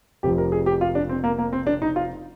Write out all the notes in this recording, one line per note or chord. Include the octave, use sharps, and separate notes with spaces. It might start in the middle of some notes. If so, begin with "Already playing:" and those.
F1 F2 C3 F3 G4
A#4
G#4
G4
F4
D4
C4
A#3
A#3
C4
D4
D#4
F4